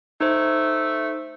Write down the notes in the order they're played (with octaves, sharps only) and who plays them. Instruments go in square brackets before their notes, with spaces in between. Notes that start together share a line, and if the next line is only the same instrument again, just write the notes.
[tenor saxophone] A3 [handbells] D#4 C5